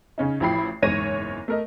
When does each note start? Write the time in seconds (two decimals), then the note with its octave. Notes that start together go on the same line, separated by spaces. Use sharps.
0.18 C#3 C#4 D#4
0.40 A1 F3 E4 G5 B5 C7
0.82 F#1 E2 G#2 C#5 A#6 D#7
1.48 A3 A#4 D#5